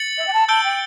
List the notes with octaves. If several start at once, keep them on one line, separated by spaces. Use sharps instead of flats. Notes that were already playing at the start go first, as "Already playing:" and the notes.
Already playing: A6 C#7 F#7
E5
G5
A5
A5 E6 G6 D7 G7
G5